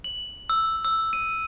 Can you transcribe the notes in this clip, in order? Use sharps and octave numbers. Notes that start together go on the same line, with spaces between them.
F#7
E6
E6
D#7